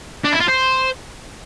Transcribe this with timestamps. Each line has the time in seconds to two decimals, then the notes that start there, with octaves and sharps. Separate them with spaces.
0.24 D4
0.32 E4
0.40 F4
0.48 C5